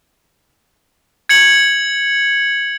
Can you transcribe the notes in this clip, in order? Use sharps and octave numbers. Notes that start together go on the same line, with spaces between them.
G#6 C#7 F#7